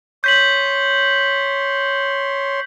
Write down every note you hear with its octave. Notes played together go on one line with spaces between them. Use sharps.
C#5 C6 G6 B6 F#7